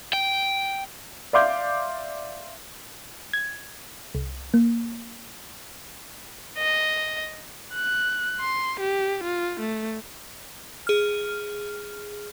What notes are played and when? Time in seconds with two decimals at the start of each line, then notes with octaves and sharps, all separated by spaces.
0.13 G5
1.33 D5 E5 F5 C6 D6 G6
3.33 G#6
4.15 C2
4.54 A#3
6.58 D#5
7.74 F#6
8.40 C6
8.80 G4
9.24 F4
9.60 A3
10.87 G#4 F6